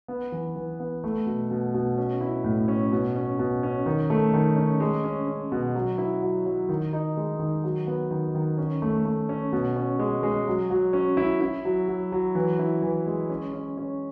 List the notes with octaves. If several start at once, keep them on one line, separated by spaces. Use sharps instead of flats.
B3
E3
E3
B3
A3
B2
B2
B2
C#4
E4
A2
C#4
B2
C#4
B2
C#4
D#3
A3
D#3
C#4
G#3
C#4
C#4
B2
F#3
E4
F#3
F#3
D#3
D#4
G#3
D#3
F#3
B3
D#3
D#3
C#4
A3
A3
C#4
B2
C#4
G#3
G#3
F#3
F#3
C#4
E4
E4
F#3
F#3
F#3
E3
E4
E3
G#3
C#4
C#4
C#4